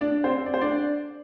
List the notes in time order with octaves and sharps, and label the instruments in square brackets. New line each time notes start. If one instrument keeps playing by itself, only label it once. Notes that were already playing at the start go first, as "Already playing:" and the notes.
[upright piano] D4 D5
C4 C5
D5
C5
D4 D5